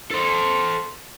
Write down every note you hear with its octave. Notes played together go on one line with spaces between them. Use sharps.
A4 C5